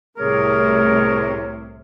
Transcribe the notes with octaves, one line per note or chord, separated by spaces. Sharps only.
C2 A2 C3 G#4 A#4 C#5